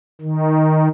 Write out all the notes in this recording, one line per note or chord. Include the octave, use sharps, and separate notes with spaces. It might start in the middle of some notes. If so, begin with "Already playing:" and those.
D#3